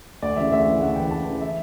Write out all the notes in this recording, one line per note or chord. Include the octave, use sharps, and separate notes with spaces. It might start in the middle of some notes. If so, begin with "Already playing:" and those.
D2 D5
C#3 E3 E5
D2 E5
C#3 E3
D2 F#5
C#3 E3 G5
D2 A5
C#3 E3
E5